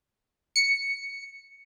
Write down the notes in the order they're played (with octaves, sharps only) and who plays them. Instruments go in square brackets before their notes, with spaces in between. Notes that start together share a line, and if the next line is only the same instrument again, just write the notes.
[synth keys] C#7